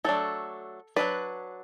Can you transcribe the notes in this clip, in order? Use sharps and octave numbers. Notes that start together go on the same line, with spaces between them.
F#3 A3 D4 A4
F#3 A3 D4 B4